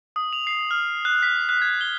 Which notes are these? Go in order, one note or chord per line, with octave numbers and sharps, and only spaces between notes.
D#6
F7
C7
F6
F#6
B6
F#6
G#6
G7